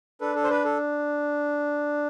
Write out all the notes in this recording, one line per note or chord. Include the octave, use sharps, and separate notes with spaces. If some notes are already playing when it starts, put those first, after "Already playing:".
D4 A4 B4
A4
C5
B4
A4